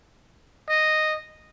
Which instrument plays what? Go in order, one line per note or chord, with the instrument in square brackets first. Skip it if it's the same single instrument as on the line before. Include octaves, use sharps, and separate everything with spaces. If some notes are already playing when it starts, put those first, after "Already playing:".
[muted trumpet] D#5